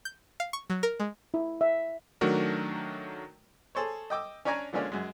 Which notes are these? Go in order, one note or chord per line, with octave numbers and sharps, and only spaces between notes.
G6
F5
C#6
F#3
A#4
G#3
E4
E5
D#3 F#3 A3 D4 F#4 A#4
G#4 A4 C5 C#5
D#5 G5 D6 E6
C#4 D4 C#5 D5 G#5 A#5
D3 F3 G#3 A#3 C#4 D4
F#2 G#3